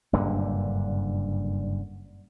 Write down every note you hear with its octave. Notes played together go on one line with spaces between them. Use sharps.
F#1 G2 A#2 D3